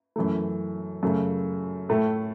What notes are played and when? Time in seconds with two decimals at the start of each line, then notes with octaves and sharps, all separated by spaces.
0.16 F#2 E3 A3
1.03 F#2 C#3 A3
1.89 A2 A3